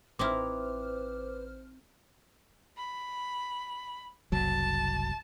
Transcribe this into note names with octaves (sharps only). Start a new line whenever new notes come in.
A1 C4 D#4 E4 B4 C5 D6 F6
B5
F#1 C2 F#3 A5